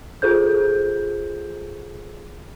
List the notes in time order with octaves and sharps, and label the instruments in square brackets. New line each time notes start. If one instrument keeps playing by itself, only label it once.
[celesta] F4 G#4 A4 C5 G6